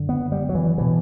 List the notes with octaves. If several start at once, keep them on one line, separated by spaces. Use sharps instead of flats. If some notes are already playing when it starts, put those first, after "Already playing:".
Already playing: F#2 D3
B3
G3
F#3
E3
B2 E3